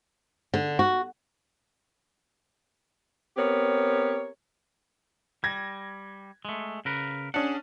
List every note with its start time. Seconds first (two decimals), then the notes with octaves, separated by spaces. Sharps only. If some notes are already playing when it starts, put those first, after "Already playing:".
0.54 D3
0.79 F#4
3.37 B3 C4 G4 A#4 C#5
5.44 G3 G#6 A#6
6.45 G#3 A3
6.85 C#3 A#4 B4
7.34 C#4 D4 G#4 F#5